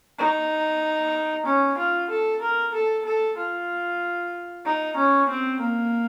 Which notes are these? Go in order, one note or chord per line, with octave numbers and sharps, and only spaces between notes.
D#4
C#4
F4
A4
A#4
A4
A4
F4
D#4
C#4
C4
A#3